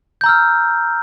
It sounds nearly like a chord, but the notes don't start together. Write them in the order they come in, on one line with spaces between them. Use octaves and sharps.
G6 A#5 E6 F6